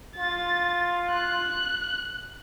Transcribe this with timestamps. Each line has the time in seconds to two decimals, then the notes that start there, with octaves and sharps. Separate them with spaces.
0.17 F4 A6
1.11 F#6